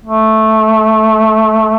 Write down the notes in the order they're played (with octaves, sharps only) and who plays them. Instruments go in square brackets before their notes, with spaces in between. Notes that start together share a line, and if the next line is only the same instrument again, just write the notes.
[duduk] A3